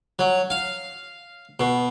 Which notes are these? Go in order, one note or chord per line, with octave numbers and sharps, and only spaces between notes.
F#3
F5
B2